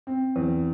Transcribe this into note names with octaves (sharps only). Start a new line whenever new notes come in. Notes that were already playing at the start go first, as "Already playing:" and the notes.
C4
E2